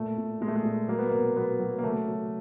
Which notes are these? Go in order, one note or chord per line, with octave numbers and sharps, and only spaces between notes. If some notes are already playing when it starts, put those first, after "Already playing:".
Already playing: A#2 A3
A#2
A#2 G#3
A3
G#3
A#2
F#3 A#3
B3
B2 A#3
F#3 B3
F#3
A#3
C#3 A3
F#3